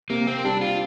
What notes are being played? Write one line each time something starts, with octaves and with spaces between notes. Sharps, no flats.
C3 A#3
C4
G3 D4
F4